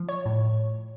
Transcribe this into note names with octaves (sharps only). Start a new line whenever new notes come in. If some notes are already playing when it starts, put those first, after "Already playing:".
Already playing: F3
C#5
A2